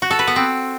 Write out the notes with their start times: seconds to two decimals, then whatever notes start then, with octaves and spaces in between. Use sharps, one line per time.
0.02 F#4
0.11 A4
0.19 B4
0.27 B3
0.36 C4